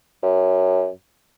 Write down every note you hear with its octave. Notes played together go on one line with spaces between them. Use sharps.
F#2